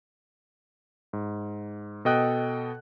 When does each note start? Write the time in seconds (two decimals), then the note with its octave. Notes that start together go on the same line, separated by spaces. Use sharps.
1.13 G#2
2.05 B2 A4 D#5 G5 D#6 F#6